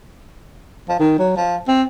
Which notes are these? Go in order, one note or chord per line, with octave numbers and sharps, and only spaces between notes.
F3
D#3
F#3
F3
C4